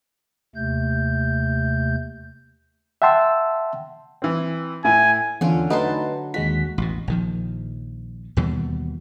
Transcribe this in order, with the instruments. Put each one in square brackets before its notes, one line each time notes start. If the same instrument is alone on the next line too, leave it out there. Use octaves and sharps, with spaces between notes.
[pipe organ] D#2 C3 A3 G6
[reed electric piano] E5 F#5 G5 A5 C6 E6
[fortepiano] E3 C4
[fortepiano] A2 E4 [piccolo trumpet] G#5
[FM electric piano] E2 F4 [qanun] D3 C#4
[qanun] F#3 A5 C6 [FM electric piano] A3 D#4 B4
[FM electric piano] D#2 G#3 B6 [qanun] F#4
[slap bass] A1 B2
A#1 D#3 F3
D#2 B2 E3 G3